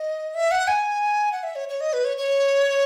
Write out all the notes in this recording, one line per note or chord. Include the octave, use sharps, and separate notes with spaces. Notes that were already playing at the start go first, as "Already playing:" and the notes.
Already playing: D#5
E5
F#5
G#5
F#5
E5
C#5
C#5
D#5
B4
C#5
C#5